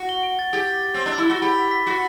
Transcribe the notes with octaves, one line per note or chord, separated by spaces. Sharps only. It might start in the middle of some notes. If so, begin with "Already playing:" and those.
Already playing: F#4
G7
D7
A6
G4 A6
A6
A6
C4 G7
D4
E6
E4
F#4 G7
G4 B5
B6
B6
F#4 B6